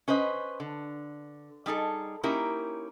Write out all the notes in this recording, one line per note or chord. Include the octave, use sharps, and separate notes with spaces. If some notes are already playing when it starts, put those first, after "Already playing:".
C#4 B4 C5 D#5
D3
G3 D#4 G#4 A4
A#3 C#4 D#4 E4 G4 A#4